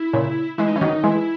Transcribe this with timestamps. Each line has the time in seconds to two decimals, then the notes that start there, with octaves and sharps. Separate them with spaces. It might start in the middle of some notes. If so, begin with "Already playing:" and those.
Already playing: E4
0.13 A#2 C#3
0.58 E3 G#3 E4
0.68 D#4
0.76 E3 C#4
0.81 D#3 F#3 D#4
1.03 E3 G#3 E4